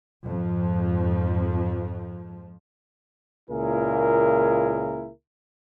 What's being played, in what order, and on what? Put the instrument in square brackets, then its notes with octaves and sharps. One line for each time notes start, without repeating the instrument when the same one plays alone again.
[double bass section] F2 G#2 F3
[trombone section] C#2 A#2 A#3 E4 G#4 A#4